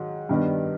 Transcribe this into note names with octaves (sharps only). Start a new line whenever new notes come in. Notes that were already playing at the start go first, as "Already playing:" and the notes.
Already playing: G#2 D#3 F#3
G2 D#3 G3 B3 D4